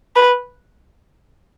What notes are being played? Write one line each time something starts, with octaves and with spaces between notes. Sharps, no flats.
B4